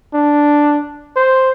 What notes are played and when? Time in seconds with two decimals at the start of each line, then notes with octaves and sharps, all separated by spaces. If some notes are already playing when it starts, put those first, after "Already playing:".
0.14 D4
1.16 C5